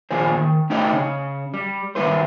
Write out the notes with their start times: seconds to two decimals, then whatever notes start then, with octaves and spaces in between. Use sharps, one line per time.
0.11 D#2 A#2 F3 G#4 C5
0.37 D#3
0.70 A3 C#4 D#4 G4 C5 D#5
0.93 C#3 C#4
1.54 G3
1.95 D#3 G3 G#3 E4 B4 C5